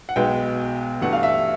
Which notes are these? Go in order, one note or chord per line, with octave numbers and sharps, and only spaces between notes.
F#5
B1 B2 G#3 B3 G5
G2 E3 A3 F#5
F5
E5